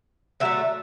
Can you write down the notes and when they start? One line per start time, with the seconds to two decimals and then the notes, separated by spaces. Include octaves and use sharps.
0.40 D3 F#3 A3 E5